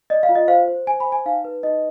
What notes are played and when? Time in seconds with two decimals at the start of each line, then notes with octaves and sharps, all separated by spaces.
0.10 D5 D#5
0.23 F5
0.29 F4
0.35 D#5
0.48 C5 F5
0.68 C5
0.87 C5 G#5
1.00 B5
1.06 C5
1.12 G#5
1.26 D#4 F5
1.45 B4
1.63 D#4 D#5